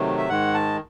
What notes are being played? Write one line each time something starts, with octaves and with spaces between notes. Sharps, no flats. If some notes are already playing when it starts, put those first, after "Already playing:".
Already playing: C3 D#3 F#3 A3
E5
G#2 D#3 G#3 F#5
A5